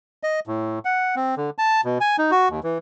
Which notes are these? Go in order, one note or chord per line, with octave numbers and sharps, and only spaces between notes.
D#5
A2
F#5
C4
D3
A5
B2
G#5
D#4
F#4
D#2
E3